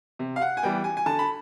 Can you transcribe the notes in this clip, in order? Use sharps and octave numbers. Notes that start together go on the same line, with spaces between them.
C3
F5
F#5
G#5
E3 G3 B3 G5
G#5
G#5
D3 A5
B5